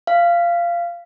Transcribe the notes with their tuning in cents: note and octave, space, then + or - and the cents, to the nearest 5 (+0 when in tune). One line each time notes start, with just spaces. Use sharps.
F5 -15